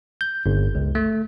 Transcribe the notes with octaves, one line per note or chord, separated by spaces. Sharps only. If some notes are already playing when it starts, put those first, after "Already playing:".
G6
G1
C#2
A3